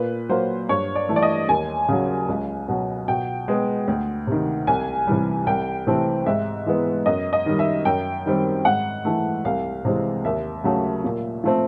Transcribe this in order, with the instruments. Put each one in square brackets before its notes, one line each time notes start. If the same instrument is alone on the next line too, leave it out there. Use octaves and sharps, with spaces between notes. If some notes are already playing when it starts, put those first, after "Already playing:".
Already playing: [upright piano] A#2 B4
F#3 A#3 C5
G2 C#5
D5
E3 A3
D5
D#5
D#2 G#5
C#3 F#3
C#2
B2 F#3
B2 G5
G#3 B3
D2
C3 D#3
C2 G#5
C3 E3 G3
C2 G5
C3 E3 A3 C4
G#2 E5
E3 G#3 B3
F#2 D#5
D#5
D#3 G3
E5
F#2 G5
D#3 G3 C4
G#2 F#5
E3 A3
C2 F5
C3 E3 G#3 C4
D#2 E5
C#3 F#3 A3
A#2
F3 A3 C4